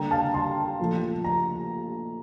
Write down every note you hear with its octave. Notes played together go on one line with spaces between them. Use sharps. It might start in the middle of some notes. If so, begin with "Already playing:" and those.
Already playing: D3 G3 A#3 G5 A#5
F5 A5
A5 C6
A#2 F3 A3
A#5